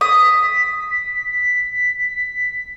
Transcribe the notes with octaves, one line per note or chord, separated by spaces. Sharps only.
D#6 B6